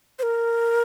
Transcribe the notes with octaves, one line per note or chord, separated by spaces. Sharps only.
C5
A#4